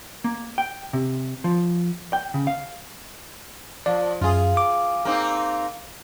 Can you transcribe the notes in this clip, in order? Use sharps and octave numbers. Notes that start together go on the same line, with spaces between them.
A#3
G5
C3
F3
G5
C#3
F5
F3 D5
F#2 F4 G#4
D6
A#3 C4 D#4